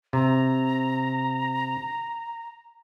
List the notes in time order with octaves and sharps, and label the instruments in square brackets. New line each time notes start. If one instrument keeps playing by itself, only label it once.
[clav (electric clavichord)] C3 [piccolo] A#5